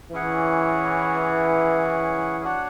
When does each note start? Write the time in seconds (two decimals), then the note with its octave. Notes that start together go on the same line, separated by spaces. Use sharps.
0.12 E3 C#4 E4 G#4 C#5 F#5
2.44 D4 F#4 C#5 F#5